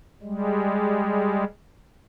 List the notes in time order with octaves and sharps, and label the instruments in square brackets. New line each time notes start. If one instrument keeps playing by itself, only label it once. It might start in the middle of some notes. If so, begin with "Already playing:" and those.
[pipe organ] G3 G#3